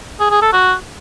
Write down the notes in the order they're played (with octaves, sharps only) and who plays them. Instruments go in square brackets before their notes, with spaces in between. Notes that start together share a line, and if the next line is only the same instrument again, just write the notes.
[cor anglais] G#4
G#4
A4
F#4